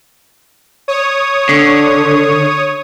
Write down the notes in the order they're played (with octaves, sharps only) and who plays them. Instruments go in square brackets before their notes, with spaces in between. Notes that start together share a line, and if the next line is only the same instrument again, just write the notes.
[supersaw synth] C#5 D#6
[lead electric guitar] D3